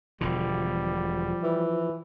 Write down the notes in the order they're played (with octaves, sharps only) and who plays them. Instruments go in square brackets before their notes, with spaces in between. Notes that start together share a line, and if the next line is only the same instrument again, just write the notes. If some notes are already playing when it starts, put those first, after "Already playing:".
[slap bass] E1 B2 D3 [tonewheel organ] F3 [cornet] G3
[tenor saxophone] E3